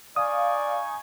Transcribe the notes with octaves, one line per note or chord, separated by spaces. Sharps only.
D#4 D5 F5 G#5 C#6 D#6